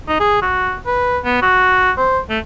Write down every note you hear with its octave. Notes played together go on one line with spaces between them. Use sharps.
D#4
G#4
F#4
B4
B3
F#4
C5
A3